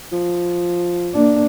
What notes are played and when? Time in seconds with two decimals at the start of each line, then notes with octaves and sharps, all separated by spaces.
0.13 F3
1.14 A#3 D4